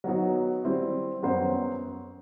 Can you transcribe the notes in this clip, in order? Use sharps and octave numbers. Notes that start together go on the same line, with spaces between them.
F#3 B3 D#4 F#4
G3 C4 E4
F#2 F#3 B3 F#4 C5